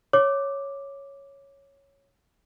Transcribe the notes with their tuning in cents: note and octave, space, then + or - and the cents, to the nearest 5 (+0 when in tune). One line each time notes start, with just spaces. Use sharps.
C#5 +0 D6 +0